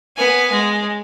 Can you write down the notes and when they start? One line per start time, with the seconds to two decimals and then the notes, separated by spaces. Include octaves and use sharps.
0.17 B3 G#5
0.51 G#3